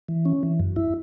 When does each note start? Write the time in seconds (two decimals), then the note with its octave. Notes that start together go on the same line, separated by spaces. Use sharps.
0.09 E3
0.25 C#4
0.43 E3
0.60 F#2
0.76 E4